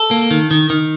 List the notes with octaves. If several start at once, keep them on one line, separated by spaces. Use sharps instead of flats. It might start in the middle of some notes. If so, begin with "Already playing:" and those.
Already playing: A4
A#3
D#3
D#3
D#3